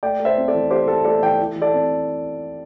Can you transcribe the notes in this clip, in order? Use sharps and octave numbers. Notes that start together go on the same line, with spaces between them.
A3 D5 G5
A3
C5 E5
C4
A4 D5
E3
A3 G4 C5
A3 A4
A3 A4 D5
E3 D5 G5
E3
E3
A4 D5
C4